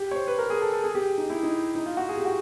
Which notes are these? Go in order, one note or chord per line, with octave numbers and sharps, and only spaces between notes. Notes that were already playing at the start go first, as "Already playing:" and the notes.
Already playing: G4
C#5
C5
B4
A#4
G#4
A4
A4
G#4
G4
D#4
E4
D#4
D#4
F4
F#4
G#4
G4
F#4